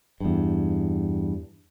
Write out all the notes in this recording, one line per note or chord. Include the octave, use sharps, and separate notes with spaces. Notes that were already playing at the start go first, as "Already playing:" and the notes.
E2 G2